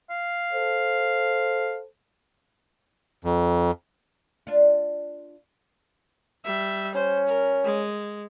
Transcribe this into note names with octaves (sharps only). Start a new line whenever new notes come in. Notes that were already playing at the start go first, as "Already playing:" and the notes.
F5
A4 C5
F2
D4 F4
G3 E5
C#4 C5
A#4
G#3